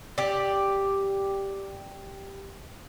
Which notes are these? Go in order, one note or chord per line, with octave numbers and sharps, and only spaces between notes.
G4 D5